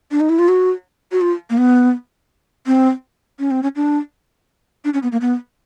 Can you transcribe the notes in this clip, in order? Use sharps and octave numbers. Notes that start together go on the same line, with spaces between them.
D4
D#4
E4
F4
F#4
F#4
F4
A#3
B3
C4
C#4
C4
C#4
D4
D4
C#4
B3
A#3
B3